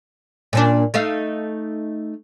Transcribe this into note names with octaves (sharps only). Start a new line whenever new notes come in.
A#2 C#4 D4
A3 D#4 F5